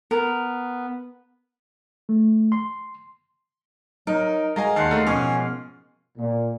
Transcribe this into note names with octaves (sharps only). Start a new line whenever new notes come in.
B3 A#4
A3
C6
F#3 D#4 A#4
G#3 F#4 D#5 F5 G#5 A#5
D#2 D#3 F5 F#5 A5 C6
D3 A3 D#4
G#2 B2 F3 C#4 G#5 F6
A#2